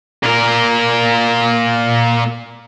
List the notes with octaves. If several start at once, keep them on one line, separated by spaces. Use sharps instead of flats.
A#2 A#4